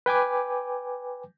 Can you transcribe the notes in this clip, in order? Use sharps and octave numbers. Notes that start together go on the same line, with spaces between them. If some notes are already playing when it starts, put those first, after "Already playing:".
B4 G5 G#5 D6